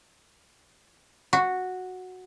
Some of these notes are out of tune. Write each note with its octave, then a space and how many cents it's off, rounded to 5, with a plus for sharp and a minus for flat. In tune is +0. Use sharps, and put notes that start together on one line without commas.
F#4 -5